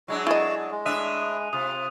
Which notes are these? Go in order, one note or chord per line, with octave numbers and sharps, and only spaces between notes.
F#3 G#3 D4 E4 F#4
E4 F#4 G#4 D#5 A5
G#3
A2 D4 E5 D#6 F#6 D#7
C3 F4 D#6